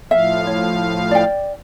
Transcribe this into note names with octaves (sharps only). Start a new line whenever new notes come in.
A2 F3 E5 F5
C#5
D5 G5